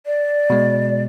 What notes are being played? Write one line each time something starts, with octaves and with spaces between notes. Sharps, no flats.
D5
B2 G#3